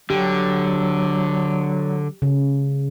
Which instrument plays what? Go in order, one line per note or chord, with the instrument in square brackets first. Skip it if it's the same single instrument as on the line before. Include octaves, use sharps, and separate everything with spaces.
[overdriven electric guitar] D3 [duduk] F#3 [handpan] G4
[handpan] C#3